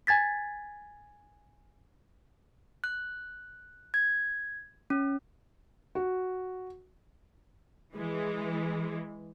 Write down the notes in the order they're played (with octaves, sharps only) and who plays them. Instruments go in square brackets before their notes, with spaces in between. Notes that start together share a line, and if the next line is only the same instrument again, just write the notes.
[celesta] G#5 G#6 A6 B6
[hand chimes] F#6
G#6
C#4
[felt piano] F#4
[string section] E3 G#3